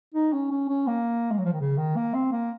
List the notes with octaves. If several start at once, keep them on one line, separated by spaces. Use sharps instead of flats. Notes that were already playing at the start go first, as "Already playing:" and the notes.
D#4
C#4
C#4
C#4
A#3
G#3
F#3
F3
D#3
C#3
D#3
A#3
C4
A#3